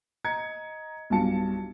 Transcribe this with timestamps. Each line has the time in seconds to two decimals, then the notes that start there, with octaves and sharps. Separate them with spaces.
0.25 D#5 A#5 G#6 C#7
1.10 B1 G2 F4 A5 C#7